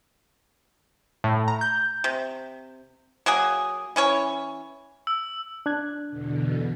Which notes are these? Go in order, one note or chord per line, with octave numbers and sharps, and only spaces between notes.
A2
A#5
G6
C3
F#3 A#3 G#4
E3 C#4 C#5
E6
D4 F#6 G#6
E2 B2 D3